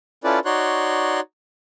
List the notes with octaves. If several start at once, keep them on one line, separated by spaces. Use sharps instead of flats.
C#4 E4 F4 A4 B4 D5
D#4 F#4 C#5 D5 C6 F#6